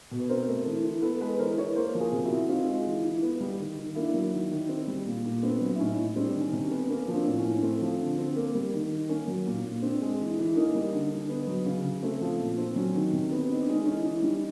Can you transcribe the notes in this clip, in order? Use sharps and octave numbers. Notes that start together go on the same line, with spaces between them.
B2
B4
C4 A#4 C5
A3
E3
E3
B3 A4 B4
G#3 A4 B4
E3 A#4 C5
E3 B4 C#5
A#3 A#4 C5
F3
G#4 A#4
C3
E4 F#4
C3
C4 D#4 F4
G#3
E3
E3
B3
G3
D#3
D#3
A#3 D4 E4
F#3
D#3
D#3
C4
G3
A#2
A#2
B3 C4 D4
F#3
E4
A2 C#4 D#4
A2
G3 C4 D4
D#3
C#4
C3
C#4
B3
D4
A#3 C#4
F3
C4 D4
A2
C#4
A2
C#4
A3 C4
F3
D3
C4
A#3
G3
D#3
D#3
A#3 C#4
F#3
A#2
A#2
C4 D4
G#3
E3
E3
A#3 C#4 D#4
G3
D3
D3
B3
F#3
C#3
C#3
A3 C4
F3
A#2
C4
F#3 C#4
D#3
C3
B3
C4 D#4
D4
G#3 C#4 D#4
E3 C#4 D#4
E3
G3 C#4 D#4